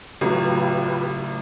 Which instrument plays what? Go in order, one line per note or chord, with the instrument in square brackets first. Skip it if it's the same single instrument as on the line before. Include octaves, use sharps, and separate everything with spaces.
[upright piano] A1 F#3 [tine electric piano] C#3 A3 [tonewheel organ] F4 G4 B4